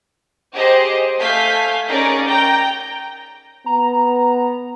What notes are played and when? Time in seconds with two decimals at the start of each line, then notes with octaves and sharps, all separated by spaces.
0.54 G4 G#4 C5 D#5
1.18 A3 F5 G#5 G6 B6
1.88 C#4 D#4 G#4 A#4 D5
2.26 G5 A#5 G6
3.66 B3 A#5